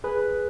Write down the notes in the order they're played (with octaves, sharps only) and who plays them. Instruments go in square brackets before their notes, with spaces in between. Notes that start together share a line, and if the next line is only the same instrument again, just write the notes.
[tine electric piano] G#4 B4